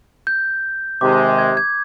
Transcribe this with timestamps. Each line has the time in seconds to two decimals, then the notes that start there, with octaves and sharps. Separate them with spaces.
0.27 G6
1.01 C3 D#3 G#3 D6
1.38 G#6
1.57 G#6